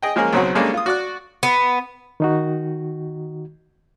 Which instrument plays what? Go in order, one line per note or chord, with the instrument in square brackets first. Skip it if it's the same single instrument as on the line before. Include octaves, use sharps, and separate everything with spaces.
[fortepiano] G#4 D#5 G5
F3 G#3 A#3 C#4 G#4 A#4
B1 C#3 F#3 C4 F#5
G3 G#3 A#3 C#4 D4 A4
F4 D#6
F#4 D5 F#6
[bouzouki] B3
[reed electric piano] D#3 D#4 F#4